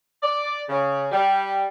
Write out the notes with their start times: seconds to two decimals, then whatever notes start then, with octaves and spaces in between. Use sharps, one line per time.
0.22 D5
0.68 C#3
1.12 G3